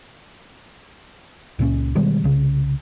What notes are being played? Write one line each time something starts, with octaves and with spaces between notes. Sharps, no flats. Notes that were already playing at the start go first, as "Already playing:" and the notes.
C#2 A#2 C4 C#4
B2 D#3 G3 G#3
C2 C#3